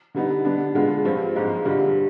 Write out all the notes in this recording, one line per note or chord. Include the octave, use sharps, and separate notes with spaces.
D3 G3 B3 D#4
D3 G3 B3 D4
D3 G#3 B3 F4 G#4
G2 F3 C4
G#2 F3 G#3
G2 D3 G3